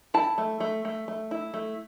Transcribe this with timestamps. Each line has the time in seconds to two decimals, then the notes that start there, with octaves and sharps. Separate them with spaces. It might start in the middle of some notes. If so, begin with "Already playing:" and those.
0.14 E4 A5
0.38 A3
0.60 A3
0.85 A3
1.08 A3
1.31 E4
1.54 A3